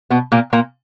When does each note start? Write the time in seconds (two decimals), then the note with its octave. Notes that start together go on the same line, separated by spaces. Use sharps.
0.10 B2 B3
0.32 A#2 A#3
0.53 A#2 A#3